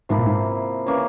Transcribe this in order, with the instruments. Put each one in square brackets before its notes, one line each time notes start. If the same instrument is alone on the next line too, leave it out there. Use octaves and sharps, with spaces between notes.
[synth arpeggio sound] G#2 [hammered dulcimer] C3 F3 A#3 E4
[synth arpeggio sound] A#2
G#2
[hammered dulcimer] C#3 E3 A#3